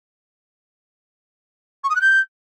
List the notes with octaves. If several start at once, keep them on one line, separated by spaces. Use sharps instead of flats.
C#6
D#6
F#6
G6